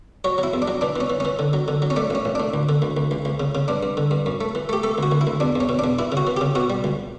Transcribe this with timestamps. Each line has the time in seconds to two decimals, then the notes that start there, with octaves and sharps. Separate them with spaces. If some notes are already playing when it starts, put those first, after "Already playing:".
0.24 F#3 C#5
0.38 F#3
0.43 E4
0.54 E2
0.62 D4
0.68 F#3
0.81 E3 D4
0.96 E3 C#4
1.10 E3
1.20 E3 C#4
1.39 D3
1.53 F#3
1.68 D3
1.82 F#3
1.90 C#4
1.96 A3 D4
2.10 A1 C#4
2.25 A1
2.35 A2 D4
2.54 D2
2.69 D3
2.82 D2
2.97 D2
3.11 C#2
3.25 C#2
3.40 C#3
3.55 C#3
3.68 G2 D4
3.83 G2
3.97 D3
4.11 G2
4.26 F#2
4.41 A3
4.55 E3
4.69 A3 G4
4.83 A3 A4
4.98 D2
5.03 F#4
5.12 D2
5.21 E4
5.27 D2
5.40 E2 D4
5.55 E2 C#4
5.69 B2
5.79 E2 D4
5.99 E3 E4
6.12 C#3
6.17 F#4
6.27 E3
6.37 C#3 G4
6.55 B2 F#4
6.70 G3
6.84 C#2